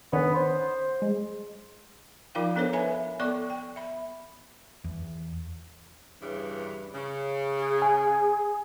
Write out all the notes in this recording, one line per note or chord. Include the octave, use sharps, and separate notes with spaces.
D3 D#3 B3 C#4
C5
G#3
F3 D#4 F4 A#4 F5 G5
B3 D4 A4 A#4 C5 C#5
A4 B4 E5 G#5 B5
B3 A4 D5 C#6 D6
G5
E5 B5
E2
G2 C#3 E3
C#3
G#4
G#5